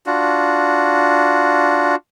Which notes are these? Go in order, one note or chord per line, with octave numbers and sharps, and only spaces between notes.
D4 F4 F#4